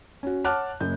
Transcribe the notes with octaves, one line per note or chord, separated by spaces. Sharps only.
C#4 F#4
C#5 F#5 A5 D6 F6 F#6
F#1 F#2 G6